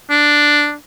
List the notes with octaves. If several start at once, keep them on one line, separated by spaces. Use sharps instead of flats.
D4